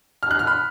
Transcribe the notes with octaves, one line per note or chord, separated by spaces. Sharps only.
F6
F#6
F6
B5